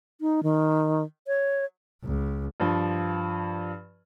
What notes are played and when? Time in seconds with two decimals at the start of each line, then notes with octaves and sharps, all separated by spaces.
0.21 D#4
0.43 D#3
1.27 C#5
2.03 C#2
2.60 G2 F3